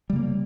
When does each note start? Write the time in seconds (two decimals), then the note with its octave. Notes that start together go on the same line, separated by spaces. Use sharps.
0.10 G3
0.13 C#3
0.16 A#3